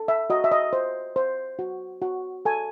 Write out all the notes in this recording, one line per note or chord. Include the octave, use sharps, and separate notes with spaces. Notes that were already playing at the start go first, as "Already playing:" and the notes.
Already playing: A4
E5
F#4 D#5
E5
D#5
C5
C5
F#4
F#4
A4 G#5